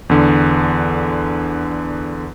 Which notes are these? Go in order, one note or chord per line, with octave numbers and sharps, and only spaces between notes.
E2 D3